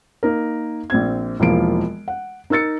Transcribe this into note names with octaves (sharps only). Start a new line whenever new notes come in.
A#3 D#4 A#4
A#1 C4 G#6
E1 E3 F3 A#3 F4 D7
F#5
D#4 A#4 E6 A6 C#7